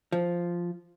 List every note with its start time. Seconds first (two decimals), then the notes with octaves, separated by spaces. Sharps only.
0.12 F3